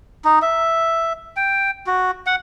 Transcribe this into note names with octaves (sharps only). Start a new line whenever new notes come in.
D#4
E5
G5
F#4
F#5